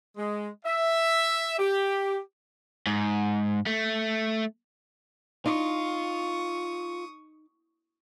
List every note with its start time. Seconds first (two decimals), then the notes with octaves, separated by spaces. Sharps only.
0.17 G#3
0.66 E5
1.58 G4
2.87 G#2
3.66 A3
5.46 D#4 F4 C#6 D#6